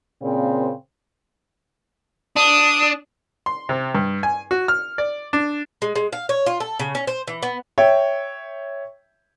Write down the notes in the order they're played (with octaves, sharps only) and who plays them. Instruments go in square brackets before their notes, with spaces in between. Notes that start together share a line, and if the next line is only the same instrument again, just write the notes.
[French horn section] A#2 C#3 C4
[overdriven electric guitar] D4 [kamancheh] D#6
[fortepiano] C6
C3
G2
G#5
F#4
F6
D5
D4
[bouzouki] G#3
G#3
F5
C#5
F4
A4
C#3
C#4
C5
E3
B3
[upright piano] C#5 E5 G5